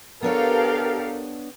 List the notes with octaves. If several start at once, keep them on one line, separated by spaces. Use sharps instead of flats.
B3 D4 G4 A4 A#4 C#5 F5